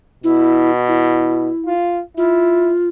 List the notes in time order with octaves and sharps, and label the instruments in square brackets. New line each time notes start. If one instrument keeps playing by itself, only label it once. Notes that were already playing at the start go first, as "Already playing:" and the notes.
[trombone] B2 [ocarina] E4
[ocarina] E4
[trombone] F4
[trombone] E4 [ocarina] F4